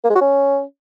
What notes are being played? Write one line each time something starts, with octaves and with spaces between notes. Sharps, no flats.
A#3
G#3
F#4
C#4